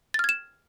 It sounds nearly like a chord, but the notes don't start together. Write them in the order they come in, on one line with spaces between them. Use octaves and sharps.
A6 F6 G#6 E7